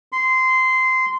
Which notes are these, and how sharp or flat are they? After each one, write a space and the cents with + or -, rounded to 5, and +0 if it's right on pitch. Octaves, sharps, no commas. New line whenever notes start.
C6 -15